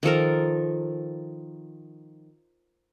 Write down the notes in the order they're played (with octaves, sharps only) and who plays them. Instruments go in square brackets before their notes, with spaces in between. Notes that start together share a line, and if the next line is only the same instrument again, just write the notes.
[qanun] D#3 F3 A4 A#4